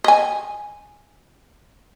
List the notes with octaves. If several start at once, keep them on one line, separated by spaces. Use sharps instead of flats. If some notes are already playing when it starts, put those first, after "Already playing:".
D#5 G#5